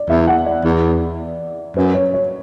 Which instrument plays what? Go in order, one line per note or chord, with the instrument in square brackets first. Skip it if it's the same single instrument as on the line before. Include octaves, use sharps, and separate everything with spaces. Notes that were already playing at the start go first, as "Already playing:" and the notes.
Already playing: [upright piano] D5
[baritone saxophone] E2 [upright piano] E5
[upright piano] F#5
D5
[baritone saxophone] E2
[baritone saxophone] F#2 [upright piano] B4
[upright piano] C#5
C#5